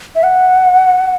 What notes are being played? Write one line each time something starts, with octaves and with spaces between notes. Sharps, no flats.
E5
F#5